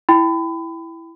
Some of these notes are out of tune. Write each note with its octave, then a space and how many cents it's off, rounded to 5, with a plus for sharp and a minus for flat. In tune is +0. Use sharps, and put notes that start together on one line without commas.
E4 +0 G5 +0 B5 +30